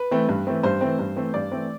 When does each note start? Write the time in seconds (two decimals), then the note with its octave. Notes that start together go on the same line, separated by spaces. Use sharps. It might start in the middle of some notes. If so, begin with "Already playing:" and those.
Already playing: B4
0.11 E3 A3 C4
0.29 G2
0.47 E3 A3 C4
0.63 G2 C5
0.81 E3 A3 C4
0.99 G2
1.17 E3 A3 C4
1.34 G2 D5
1.52 E3 A3 C4